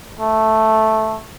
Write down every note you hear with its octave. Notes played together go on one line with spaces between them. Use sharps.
A3